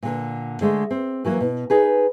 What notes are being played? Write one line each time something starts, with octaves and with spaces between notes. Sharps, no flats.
A#2 D3
D3 G#3 A3
C4
E3 F#3 A#3
B2
D#4 G#4 B4